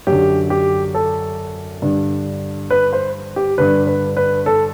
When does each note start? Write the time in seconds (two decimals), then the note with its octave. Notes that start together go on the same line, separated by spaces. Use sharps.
0.07 F#2 D3 G4
0.50 G4
0.94 A4
1.82 G2 D3
2.70 B4
2.93 C5
3.36 G4
3.58 G2 D3 B4
3.87 B4
4.17 B4
4.46 A4